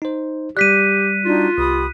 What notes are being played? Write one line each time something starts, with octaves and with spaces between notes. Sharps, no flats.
D#4 C5
G3 G4 D5 F#6 B6 D#7
D4 D#4 F4 F#4
C2 G4 B5 D#6